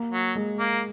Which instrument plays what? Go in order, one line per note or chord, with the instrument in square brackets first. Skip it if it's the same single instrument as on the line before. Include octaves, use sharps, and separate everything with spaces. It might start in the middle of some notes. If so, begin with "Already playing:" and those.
Already playing: [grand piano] A#3
[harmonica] F#3
[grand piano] G#3
[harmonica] A#3